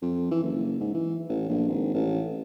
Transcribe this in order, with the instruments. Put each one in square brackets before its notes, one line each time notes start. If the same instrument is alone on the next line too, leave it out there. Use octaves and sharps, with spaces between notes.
[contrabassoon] F2
E3
F#1
G#2
E3
A1
A#1
G#1
A1